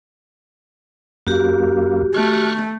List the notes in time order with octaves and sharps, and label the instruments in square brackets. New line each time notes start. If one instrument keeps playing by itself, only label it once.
[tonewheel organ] F#2 A#3 [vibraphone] F#4 G4
[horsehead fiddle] A3 [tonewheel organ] C#6 F6 F#6